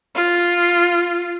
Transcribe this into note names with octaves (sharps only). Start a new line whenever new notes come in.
F4